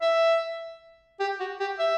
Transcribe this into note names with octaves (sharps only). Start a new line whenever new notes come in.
E5
G4
F#4
G4
E5